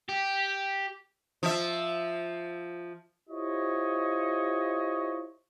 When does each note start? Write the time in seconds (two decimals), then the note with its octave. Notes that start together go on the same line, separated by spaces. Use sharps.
0.09 G4
1.43 F3 E5
3.29 E4 F4 G4 C5 C#5 D#5